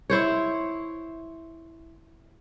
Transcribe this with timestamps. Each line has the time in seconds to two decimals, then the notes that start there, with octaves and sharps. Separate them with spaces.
0.10 E4 C5 C#5